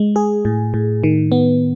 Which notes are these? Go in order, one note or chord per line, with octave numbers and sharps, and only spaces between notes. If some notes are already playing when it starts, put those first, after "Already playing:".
Already playing: G#3
G#4
A2
A2
D#3
B3